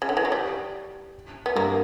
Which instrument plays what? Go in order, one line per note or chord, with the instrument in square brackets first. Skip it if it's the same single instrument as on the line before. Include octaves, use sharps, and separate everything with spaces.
[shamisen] C#3
D3
E3
F#3
G3
B3
[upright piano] G2 [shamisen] A#3